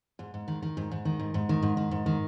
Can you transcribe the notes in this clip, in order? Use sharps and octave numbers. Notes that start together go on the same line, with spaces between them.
G#2
G#2
D#3
D#3
G#2
G#2
D#3
G#2
G#2
D#3
G#2
D#3
G#2
D#3